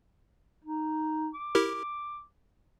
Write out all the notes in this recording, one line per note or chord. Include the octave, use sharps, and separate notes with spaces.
D#4
D6
E4 G4 A#4